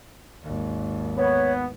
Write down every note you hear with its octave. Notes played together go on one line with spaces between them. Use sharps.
G#1 D#2
B3 C#5